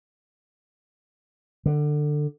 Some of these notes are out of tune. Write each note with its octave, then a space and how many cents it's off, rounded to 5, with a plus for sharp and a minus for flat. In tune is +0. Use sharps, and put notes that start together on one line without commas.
D3 +20